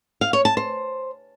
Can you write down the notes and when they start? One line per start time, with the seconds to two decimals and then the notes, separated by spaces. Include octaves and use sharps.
0.21 F5
0.33 C#5
0.45 A5
0.57 C5